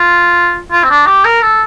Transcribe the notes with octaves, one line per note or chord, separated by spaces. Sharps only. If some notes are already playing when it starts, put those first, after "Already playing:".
Already playing: F4
F4
C4
D4
G4
A#4
A4